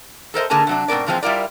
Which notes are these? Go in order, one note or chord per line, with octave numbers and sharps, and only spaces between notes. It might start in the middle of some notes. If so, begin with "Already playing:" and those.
A4 A#4 C5 D#5
G#2 D3 A#3 G#4 A#4 A5
C3 F#3 D4
G#2 B2 C4 A#4 D5
A#2 E3 F3 G#3 A#3 C4
G3 E4 F4 A#4 D5